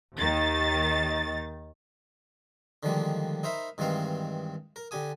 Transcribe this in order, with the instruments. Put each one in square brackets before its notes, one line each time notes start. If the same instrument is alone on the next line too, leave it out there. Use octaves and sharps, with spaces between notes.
[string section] D#2 D#3 A6
[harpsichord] D3 D#3 F3 G3 G#3 A#3
D#4 A#4 C5 E5 B5
G2 D#3 E3 G#3 C4 F5
A#4
D3 G4 G#5 D#6